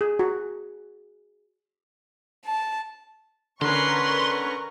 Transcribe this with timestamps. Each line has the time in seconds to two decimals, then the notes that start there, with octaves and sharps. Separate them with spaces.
0.01 G#4
0.19 F#4
2.46 A5
3.61 D3 C#4 A#4 B4 C6 C#6